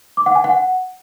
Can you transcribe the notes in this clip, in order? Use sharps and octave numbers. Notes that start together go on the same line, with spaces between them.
D6
F#5
G#5
F#5